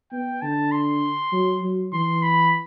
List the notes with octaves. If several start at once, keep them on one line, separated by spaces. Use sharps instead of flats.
B3 G5
D3 A5
C6
F#3
F#3
E3 C6
B5